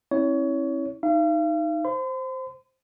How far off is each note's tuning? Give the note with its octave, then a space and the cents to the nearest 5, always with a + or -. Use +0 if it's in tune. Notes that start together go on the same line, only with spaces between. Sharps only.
C4 +45 E4 -30 C#5 +25
D#4 +0 F5 -40
C5 +0 C6 -45